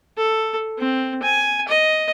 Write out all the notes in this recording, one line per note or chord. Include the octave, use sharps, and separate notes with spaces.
A4
C4
G#5
D#5